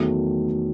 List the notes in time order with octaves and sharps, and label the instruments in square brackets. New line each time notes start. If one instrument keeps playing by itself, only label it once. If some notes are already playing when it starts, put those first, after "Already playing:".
Already playing: [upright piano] E2 D#3 F#3 A3